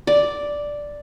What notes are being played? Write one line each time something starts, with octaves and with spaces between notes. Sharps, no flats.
D5